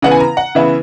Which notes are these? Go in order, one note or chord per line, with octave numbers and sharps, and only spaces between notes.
C#3 E3 B3 F#5
G#5
A#5
F#5
C#3 E3 B3 E5